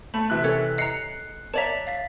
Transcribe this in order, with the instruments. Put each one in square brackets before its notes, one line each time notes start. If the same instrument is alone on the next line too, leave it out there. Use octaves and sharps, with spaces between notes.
[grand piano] A3 [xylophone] B5
[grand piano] C3 E3 F#6
[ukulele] C#4 A4 C#5
[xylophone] D#5 A#5 [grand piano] F#6 C7 C#7
[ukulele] C#5 D5 E5 [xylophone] A5 A#5
[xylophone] F5 A6 B6